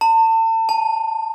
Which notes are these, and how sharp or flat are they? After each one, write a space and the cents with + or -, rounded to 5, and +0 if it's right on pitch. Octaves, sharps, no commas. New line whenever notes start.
A5 +40
A5 -15